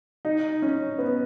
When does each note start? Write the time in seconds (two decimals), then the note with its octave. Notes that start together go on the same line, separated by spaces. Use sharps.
0.25 D#4
0.62 C#4
0.99 B3